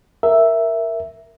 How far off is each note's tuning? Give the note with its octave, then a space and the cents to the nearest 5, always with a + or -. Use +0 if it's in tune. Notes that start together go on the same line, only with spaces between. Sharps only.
A#4 +0 E5 +0